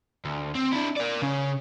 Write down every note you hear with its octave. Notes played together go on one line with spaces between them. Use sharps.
D2
C4
D4 E4
A#4 D5
C#3 C#4